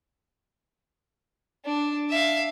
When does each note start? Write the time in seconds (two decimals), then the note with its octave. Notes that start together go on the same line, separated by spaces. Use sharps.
1.65 D4
2.10 E5 F5